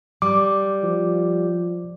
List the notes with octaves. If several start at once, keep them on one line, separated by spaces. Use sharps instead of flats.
G3 D6
F3